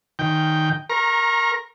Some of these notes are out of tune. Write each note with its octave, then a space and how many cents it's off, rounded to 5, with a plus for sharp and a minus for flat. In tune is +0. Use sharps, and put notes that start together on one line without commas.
D#3 +0 G5 +0
A#4 +0 A#5 +20 C#6 -35